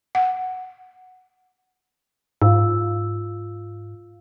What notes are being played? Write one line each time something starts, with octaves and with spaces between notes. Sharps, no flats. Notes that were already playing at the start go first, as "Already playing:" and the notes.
F#5
G#2 F4 F5 E6